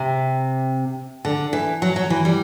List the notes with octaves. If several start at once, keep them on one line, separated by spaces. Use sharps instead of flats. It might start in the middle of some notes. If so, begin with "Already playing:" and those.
Already playing: C3
D3
E3
F#3
F#3
E3
G3